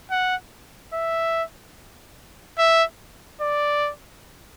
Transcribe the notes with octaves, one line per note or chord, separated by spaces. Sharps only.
F#5
E5
E5
D5